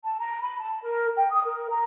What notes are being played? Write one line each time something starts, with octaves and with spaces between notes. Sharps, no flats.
A5
A#5
B5
A5
A#4
G5
D#6
A#4
A#5